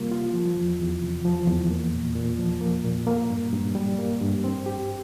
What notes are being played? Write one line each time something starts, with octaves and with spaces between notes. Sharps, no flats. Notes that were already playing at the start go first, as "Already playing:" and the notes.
Already playing: C3 G3 A#3 F4
F4
F3
E2
E2
C3
F3
E2
A#3
A#2
A#2
F3
A#3
A#2
A#3
G2
G2
G3
A#3
G2
C4
G4